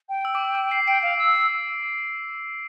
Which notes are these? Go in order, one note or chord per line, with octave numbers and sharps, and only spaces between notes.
G5
E6
D6
E6
E6
C7
G5 D7
F5 D7
E6